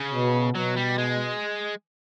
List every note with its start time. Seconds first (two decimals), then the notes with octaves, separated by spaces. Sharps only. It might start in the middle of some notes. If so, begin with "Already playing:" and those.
Already playing: C#3
0.12 B2
0.55 B2 F#3
0.76 G3
0.98 G#3